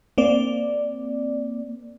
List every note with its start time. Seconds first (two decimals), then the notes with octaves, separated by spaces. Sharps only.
0.18 A#3 C4 D5